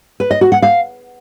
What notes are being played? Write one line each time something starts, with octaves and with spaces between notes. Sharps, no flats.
B4
D#5
F#4
F#5
F5